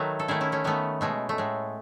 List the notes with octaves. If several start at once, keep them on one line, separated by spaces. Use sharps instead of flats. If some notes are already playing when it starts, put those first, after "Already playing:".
Already playing: D#3 F#3 A3 F#4 B4
A4
D#3 A3 E4 G#4
C#4 E4
A3 C#4
D#3 A3 B3
B2 G#3 A3
A3
A2 G#3